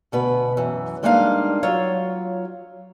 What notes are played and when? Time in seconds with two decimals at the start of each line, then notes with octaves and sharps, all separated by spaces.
0.12 D2 B2 B4
0.57 F#2 E3
1.03 G3 G#3 A#3 D4 D#4 F5
1.63 F#3 F4 C#5